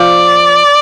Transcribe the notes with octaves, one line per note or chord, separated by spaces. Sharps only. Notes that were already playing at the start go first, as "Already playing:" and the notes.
Already playing: F3 D5